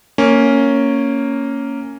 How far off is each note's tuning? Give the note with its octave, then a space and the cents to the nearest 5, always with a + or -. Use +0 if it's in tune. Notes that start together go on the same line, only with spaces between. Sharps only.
A#3 -10 C#4 +0